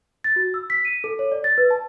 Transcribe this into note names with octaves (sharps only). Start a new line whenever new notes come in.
A6
F#4
E6
B6
D#7
A4
C#5
D5
A6
B4
A5